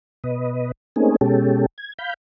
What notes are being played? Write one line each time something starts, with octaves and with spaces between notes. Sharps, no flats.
B2 B4 D#5
A3 A#3 C4 C#4 D#4 G#4
B2 G#3 C#4 G4 A4
G#6
F5 B5 G6